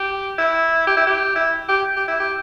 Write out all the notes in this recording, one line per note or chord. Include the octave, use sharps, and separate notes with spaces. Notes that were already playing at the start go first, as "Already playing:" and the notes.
Already playing: G4
E4
G4
E4
G4
E4
G4
G4
E4
G4